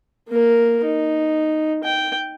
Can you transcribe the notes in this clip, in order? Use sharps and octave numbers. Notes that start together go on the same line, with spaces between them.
A#3 A#4
D#4
G5